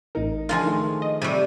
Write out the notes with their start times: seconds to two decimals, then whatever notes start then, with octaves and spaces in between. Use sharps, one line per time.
0.15 A1 D#4 A#4
0.49 D3 F3 G#3 F4 A#4 G#5
0.65 D#3 A3
1.02 D#5
1.22 C3 G3 C#6 E6 D#7